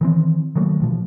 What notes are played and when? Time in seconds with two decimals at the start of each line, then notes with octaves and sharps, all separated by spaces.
0.01 D#3 E3 C4
0.56 D#3 F#3 A3 A#3
0.80 A1 B2 F3